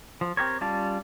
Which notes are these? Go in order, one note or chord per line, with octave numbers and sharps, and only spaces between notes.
F3
C4 G4 A#4 C#5
G3 C#4 F4 A5 D6